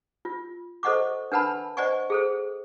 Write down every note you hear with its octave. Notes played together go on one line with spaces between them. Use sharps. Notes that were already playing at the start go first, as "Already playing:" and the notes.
F4
A4 C5 D#5 F#5 C#6 D6
D4 A#4 B4 F#5 A5 B5
C5 D5 D#5 F#5 G#5 C#6
G#4 A4 C5